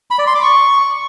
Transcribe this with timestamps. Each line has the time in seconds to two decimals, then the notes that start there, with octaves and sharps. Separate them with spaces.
0.11 B5
0.19 D5
0.27 C6
0.35 D6
0.43 C#6